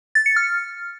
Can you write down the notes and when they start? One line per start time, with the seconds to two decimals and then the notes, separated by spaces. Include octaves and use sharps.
0.15 A6
0.26 C#7
0.36 F6